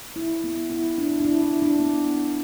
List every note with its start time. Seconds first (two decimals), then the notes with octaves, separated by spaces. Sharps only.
0.16 E4
0.44 B3
0.70 E4
0.98 D4
1.20 D4
1.25 E4
1.43 E4
1.62 D4
1.80 B3